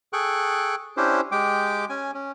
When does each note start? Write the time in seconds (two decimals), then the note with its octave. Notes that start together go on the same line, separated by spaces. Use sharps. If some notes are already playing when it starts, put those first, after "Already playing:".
0.13 G#4 A4 G5 C#6 F#6
0.97 C#4 D4 E4 G4 C5
1.32 G#3 G4 G5 D6
1.90 C#4 G#5
2.14 C#4